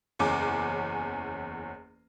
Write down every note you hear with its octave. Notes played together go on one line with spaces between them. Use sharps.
F#1 E2 C#4 D6